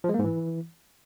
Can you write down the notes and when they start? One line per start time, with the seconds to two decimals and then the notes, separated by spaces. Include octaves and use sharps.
0.04 F3
0.09 G#3
0.14 A#3
0.19 G#2
0.24 E3